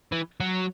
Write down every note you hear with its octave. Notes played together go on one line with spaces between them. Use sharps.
E3
F#3